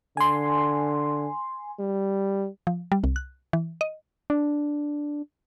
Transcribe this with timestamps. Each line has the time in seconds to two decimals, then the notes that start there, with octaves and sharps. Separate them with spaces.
0.17 D3 G#5 C6
1.80 G3
2.67 F3
2.92 G3
3.04 C2
3.16 F#6
3.53 E3
3.81 D#5
4.30 D4